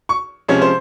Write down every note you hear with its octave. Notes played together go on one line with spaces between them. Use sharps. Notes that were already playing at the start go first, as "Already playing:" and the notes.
C#6
C3 F3 G#3 C#4 C#5
C5